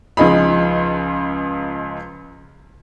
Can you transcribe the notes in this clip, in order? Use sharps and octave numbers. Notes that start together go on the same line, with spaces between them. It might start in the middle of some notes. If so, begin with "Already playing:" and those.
C#2 F3 D#4 G#4 B5